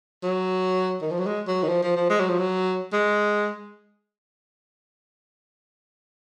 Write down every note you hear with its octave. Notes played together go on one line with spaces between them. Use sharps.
F#3
D#3
F3
F#3
G#3
F#3
D#3
F3
F3
F3
G#3
F#3
F3
F#3
G#3